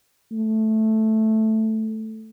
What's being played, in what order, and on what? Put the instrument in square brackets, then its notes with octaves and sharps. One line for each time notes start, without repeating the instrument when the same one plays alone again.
[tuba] A3